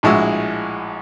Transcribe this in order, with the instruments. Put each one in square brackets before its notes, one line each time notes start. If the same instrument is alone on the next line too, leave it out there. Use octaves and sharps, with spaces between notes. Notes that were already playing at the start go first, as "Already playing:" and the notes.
[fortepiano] A#1 A2 G#3 E4 F#4 E6